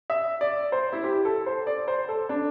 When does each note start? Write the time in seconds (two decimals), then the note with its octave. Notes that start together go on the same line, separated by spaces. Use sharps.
0.10 E5
0.41 D5
0.72 C5
0.93 E4
1.04 G4
1.25 A4
1.46 C5
1.67 D5
1.88 C5
2.09 A4
2.29 D4